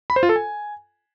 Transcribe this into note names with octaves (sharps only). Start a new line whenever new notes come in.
B5
C5
F4
A4
G#5